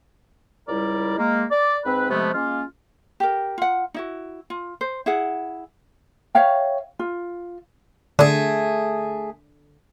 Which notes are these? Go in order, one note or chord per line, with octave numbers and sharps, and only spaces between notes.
C#2 G3 E4 A#4 D5
G#3 A#3
D5
G#2 C4 B4
C3 F3 G#3 A3 B3
G#3 A#3 C#4 F4
G4 A#4
F4 F#5
D#4 E4 F#4
F4
C5
E4 G#4 F#5
C#5 E5 F5 G5
F4
D3 A3 G#4